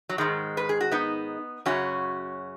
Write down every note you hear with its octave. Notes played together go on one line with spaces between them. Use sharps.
F#3
G#2 D#3 G#3
B4
G#4
F#4
B3 D#4
F#2 C#3 C#4 F#4